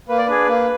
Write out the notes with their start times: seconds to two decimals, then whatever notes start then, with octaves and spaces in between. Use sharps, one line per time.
0.08 A#3 B4
0.18 D5
0.26 D4 G#4 B4
0.48 A#3